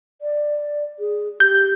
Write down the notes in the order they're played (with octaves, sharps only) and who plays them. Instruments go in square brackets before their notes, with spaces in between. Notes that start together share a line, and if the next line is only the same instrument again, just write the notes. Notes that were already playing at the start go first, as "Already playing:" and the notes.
[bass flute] D5
G#4
[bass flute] G4 [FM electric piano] G6